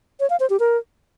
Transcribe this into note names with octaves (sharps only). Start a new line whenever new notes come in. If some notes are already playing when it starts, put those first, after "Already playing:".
C#5
F5
C5
G4
A#4